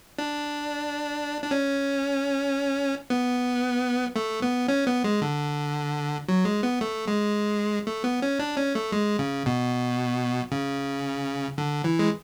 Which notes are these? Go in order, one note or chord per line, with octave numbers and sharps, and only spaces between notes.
D4
D4
C#4
B3
A3
B3
C#4
B3
G#3
D3
F#3
G#3
B3
A3
G#3
A3
B3
C#4
D4
C#4
A3
G#3
C#3
B2
C#3
D3
E3
G#3